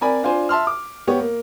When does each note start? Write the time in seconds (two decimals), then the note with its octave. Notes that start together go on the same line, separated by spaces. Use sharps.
0.01 C4 A#4 D5 G#5 B5
0.23 D4 F4 C5 G#5
0.49 E5 A5 C6 F6
0.67 D6
1.07 B3 G4 C#5
1.20 A#3